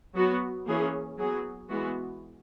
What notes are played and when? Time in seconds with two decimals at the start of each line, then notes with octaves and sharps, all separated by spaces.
0.16 F#3 B3 F#4
0.67 E3 A#3 C#4 G#4
1.18 F#3 B3 G#4
1.69 E3 G#3 B3 F#4